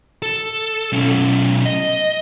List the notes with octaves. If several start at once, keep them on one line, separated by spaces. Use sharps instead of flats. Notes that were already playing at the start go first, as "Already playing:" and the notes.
A4
B1 C#4
D#5